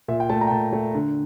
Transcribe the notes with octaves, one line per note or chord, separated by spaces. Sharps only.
A#2 E5
G5
A3 A5
A#5
G5
A#2 A5
A3
D3